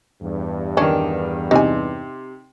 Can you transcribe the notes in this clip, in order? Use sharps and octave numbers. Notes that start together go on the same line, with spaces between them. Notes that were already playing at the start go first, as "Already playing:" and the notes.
E2 G2
D#3 C#4 D4
C3 D#4 G#5